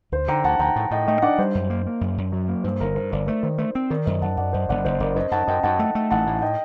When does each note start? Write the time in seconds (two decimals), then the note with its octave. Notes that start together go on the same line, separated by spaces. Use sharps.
0.12 D2 C5
0.28 D3 G5 A#5
0.44 D2 F#5 A5
0.59 D2 G5 A#5
0.76 A2
0.91 A2 D#5 G5
1.07 A3 D#5 G5
1.22 D4 D5 F#5
1.38 G3 C5
1.55 F#2
1.70 A#3
1.86 A#3
2.01 F#2
2.18 F#2
2.32 F#3
2.49 A#3
2.64 G2 C5
2.80 G1 A#4
2.95 G2 C5
3.11 G1 A#4 D5
3.28 A3 C5
3.43 D#3 C5
3.58 A3 C5
3.75 C4
3.90 D#3 A#4 D5
4.06 F#2 C5 D#5
4.22 F#2 F#5 A5
4.37 F#2 D5 F#5
4.53 F#2 C5 D#5
4.69 F#1 D5 F#5
4.85 F#1 C5 D#5
5.00 F#1 A#4 D5
5.16 F#2 C5 D#5
5.32 F#2 F#5 A5
5.47 F#2 D#5 G5
5.63 F#2 F#5 A5
5.79 A3
5.95 A3
6.11 A1 F#5 A5
6.27 A2
6.42 D#5 G5